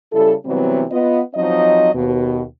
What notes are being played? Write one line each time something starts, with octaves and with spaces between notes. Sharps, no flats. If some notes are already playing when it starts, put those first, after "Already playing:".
C#3 G3 E4 A4
C3 E3 F#3 G3 B3 C4
B3 F4 D#5
F3 F#3 C4 D#4 D#5
D#2 B2